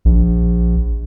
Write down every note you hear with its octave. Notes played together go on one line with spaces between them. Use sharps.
A#1